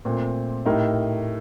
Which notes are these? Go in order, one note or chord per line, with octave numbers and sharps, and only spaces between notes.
A#2 A3 C4
A2 A3 D#4 G4 A#4